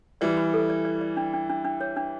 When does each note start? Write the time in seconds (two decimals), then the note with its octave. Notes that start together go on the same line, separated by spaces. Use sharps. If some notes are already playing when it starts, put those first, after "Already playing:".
0.21 E3 G3 D5
0.37 B5
0.54 A4
0.70 D5
0.85 D5
1.01 D5
1.17 D4
1.34 D4
1.49 D4
1.65 D4
1.81 C#5
1.96 D4